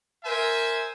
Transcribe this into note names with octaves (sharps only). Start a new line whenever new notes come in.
A#4 C5 E5 G#5